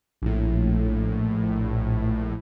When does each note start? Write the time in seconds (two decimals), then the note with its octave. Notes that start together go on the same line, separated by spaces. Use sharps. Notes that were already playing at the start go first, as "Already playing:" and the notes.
0.22 A#1 A2